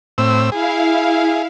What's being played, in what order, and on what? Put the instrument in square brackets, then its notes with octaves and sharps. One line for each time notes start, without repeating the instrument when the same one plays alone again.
[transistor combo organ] A2 C4 E6
[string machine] E4 F5 [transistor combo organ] G#4